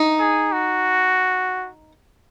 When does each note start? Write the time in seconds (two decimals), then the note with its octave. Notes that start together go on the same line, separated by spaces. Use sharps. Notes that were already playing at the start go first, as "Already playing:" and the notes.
Already playing: D#4
0.20 G#4
0.52 F#4